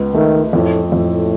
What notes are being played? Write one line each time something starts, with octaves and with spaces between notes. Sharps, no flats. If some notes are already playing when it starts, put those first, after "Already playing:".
Already playing: C#2 B3
D#3 A3
F2 A2
F2 A2